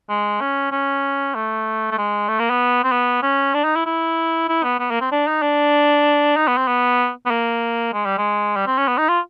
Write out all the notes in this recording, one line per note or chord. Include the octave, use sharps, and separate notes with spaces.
G#3
C#4
C#4
A3
A3
G#3
A3
A#3
B3
C4
B3
C#4
D4
D#4
E4
E4
E4
B3
B3
A#3
C4
D4
D#4
D4
D#4
B3
C4
B3
B3
A#3
G#3
G3
G#3
G3
C4
C#4
B3
D#4
F4